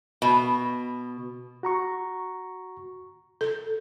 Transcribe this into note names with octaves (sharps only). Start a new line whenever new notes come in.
B2
F#4 A#5 C#6
A4